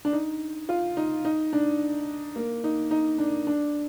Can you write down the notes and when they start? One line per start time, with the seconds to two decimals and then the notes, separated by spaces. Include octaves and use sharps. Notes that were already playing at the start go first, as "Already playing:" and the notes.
0.05 D4
0.13 D#4
0.69 F4
0.97 D#4
1.25 D#4
1.53 D4
2.36 A#3
2.64 D#4
2.91 D#4
3.18 D4
3.47 D4